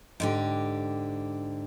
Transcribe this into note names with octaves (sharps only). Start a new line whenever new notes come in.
G#2 D3 G4